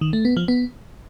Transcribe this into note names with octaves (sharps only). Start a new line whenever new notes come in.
D#3
A3
B3
F3
B3